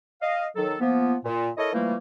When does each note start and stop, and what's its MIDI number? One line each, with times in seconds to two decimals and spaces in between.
0.22 0.46 75
0.22 0.46 77
0.56 0.75 51
0.56 0.75 54
0.56 0.75 69
0.80 1.15 53
0.80 1.15 58
0.80 1.15 59
1.25 1.50 46
1.58 1.71 64
1.58 1.71 69
1.58 1.71 70
1.58 1.71 73
1.58 1.71 75
1.73 1.96 52
1.73 1.96 53
1.73 1.96 55
1.73 1.96 57
1.73 1.96 58